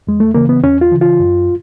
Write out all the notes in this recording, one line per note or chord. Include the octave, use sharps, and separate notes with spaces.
E2 G#3
A3
C#3 E3 A#3
B3
E2 C#4
F4
C#3 E3
F4
F#2